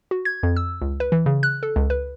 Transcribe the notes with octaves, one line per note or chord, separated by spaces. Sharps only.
F#4
G#6
F2
E6
C#2
B4
E3
C#3
F#6
A4
C#2
B4